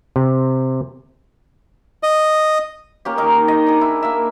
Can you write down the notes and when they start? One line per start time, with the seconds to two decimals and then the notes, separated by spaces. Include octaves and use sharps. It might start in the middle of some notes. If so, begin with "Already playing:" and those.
0.16 C3
2.03 D#5
3.05 A#3 C#4 G4
3.17 D#3 D#4 A#4
3.48 D#5
3.67 D4 G#4
3.81 E4
4.02 A#3 E5